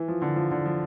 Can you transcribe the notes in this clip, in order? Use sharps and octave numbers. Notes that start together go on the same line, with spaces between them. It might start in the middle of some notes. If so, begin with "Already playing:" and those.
Already playing: E3
F3
D3
F3
D3
F3